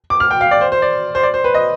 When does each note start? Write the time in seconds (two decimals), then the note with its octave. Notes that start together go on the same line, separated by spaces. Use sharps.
0.10 D6
0.20 F6
0.31 G5
0.41 F5
0.51 D5
0.61 C5
0.72 C5
0.82 D5
1.15 C5
1.23 D5
1.34 C5
1.44 B4
1.54 D#5